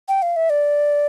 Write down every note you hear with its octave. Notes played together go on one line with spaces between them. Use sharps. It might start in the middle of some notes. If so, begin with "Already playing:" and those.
G5
F5
E5
D5